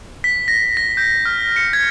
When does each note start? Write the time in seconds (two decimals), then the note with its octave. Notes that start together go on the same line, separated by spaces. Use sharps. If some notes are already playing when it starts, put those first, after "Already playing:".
0.24 B6
0.48 A#6
0.77 A#6
0.97 G6
1.25 F6
1.56 C#7
1.73 G#6